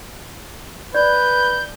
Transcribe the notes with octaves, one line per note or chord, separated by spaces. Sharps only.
B4 D5 G6